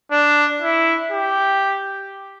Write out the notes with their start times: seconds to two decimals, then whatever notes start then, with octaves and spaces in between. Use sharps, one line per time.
0.12 D4
0.62 E4
1.11 G4